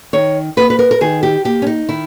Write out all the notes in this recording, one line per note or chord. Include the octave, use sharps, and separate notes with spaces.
D#3 C#5
A#3 B4
B4
A#4
A#4
D#3 G#4
G4
A#3 G4
C#4
D#4
D#3 E4